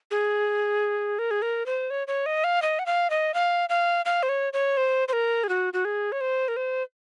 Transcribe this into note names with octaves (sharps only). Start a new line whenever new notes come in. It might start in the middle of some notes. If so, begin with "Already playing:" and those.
G#4
A#4
G#4
A#4
C5
C#5
C#5
D#5
F5
D#5
F#5
F5
D#5
F5
F5
F5
C5
C#5
C#5
C5
C5
A#4
G#4
F#4
F#4
G#4
C#5
C5
A#4
C5